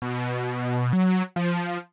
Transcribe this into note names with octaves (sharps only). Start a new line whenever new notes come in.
B2
F#3
F3